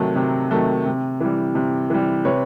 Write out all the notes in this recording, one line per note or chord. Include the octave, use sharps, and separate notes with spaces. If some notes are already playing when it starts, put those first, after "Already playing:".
Already playing: C3 D#3 F#3 A3
C3
D#3 F#3 A3
C3
E3 G3
C3
E3 G3
C3 B4 C#5